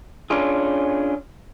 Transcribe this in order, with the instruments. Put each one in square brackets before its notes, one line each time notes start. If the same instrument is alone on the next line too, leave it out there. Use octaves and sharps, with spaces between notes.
[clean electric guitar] C#4 D4 F4 G#4